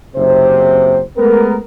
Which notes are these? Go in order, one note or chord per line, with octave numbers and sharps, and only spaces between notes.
F#1 C3 C5
G#3 A3 B3 A#4